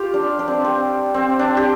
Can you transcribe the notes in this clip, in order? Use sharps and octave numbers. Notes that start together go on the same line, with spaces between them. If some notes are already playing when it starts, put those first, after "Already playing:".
Already playing: F4 G4
D4
D4
C4
C4
C4
D4
G4